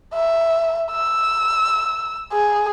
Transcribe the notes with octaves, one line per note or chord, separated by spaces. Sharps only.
E5
E6
G#4